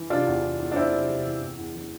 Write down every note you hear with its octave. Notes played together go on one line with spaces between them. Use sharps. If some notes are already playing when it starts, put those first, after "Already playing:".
Already playing: E3
C3 D4 F4
E2
E2
E2
D4
E2 C4 E4
C3
C3
E3
E2
E2
E3